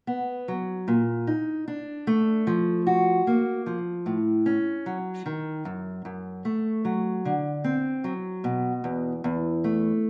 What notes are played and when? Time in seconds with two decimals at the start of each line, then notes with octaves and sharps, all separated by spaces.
0.07 B3
0.48 F#3
0.88 A#2
1.27 D#4
1.68 D4
2.07 A3
2.47 F3
2.87 F#4
3.27 A#3
3.66 F3
4.06 A2
4.46 C#4
4.86 F#3
5.26 D#3
5.65 F#2
6.05 F#2
6.45 A3
6.85 F#3
7.25 D3
7.64 C4
8.04 F#3
8.44 B2
8.84 E2
9.24 E2
9.64 A3